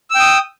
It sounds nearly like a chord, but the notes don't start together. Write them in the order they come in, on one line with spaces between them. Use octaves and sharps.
E6 G5 D#6